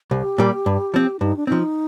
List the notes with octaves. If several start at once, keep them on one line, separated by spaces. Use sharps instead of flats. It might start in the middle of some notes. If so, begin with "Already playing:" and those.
C2 G4
A#2 G3 A#3
G2
F3 C4
G2 D#4
D4
F3 C4 D#4